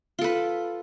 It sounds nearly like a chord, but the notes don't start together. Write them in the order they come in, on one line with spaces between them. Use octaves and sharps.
F4 A4 B4